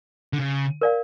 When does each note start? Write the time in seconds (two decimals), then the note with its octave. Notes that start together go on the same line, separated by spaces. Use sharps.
0.33 D3
0.39 C#3
0.81 A#4 D5 F5